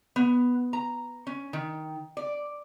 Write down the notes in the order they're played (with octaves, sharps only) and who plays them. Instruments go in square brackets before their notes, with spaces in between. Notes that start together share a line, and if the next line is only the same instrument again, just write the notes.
[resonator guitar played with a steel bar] B3
A#5
C#4
D#3
D5